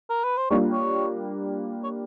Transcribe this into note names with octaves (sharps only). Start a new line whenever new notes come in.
A#4
B4
C5
G3 A#3 D4 F4 C#5
C#5
C#5